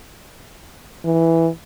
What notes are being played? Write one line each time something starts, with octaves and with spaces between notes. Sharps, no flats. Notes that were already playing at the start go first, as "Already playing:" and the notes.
E3